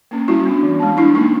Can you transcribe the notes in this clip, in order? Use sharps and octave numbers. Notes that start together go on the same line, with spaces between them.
A#3 C#4
G3 E4 F#4
B3 D4
E3
G#3 C4
G3 D4 E4
A#3 C#4 D#4